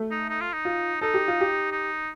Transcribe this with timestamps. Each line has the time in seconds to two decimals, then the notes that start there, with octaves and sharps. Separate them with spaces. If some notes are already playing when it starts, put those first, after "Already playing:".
Already playing: A3
0.11 D#4
0.29 D#4
0.41 F4
0.53 D#4
0.65 F4
1.01 D#4 A4
1.14 G4
1.28 F4
1.41 G4
1.72 D#4